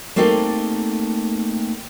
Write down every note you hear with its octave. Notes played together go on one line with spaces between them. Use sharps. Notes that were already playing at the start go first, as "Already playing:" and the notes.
A3 A#3 C4 D#4 G4 A4